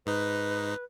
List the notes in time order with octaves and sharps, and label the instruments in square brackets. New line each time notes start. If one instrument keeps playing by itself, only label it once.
[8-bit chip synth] G#2 D#4 [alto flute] B4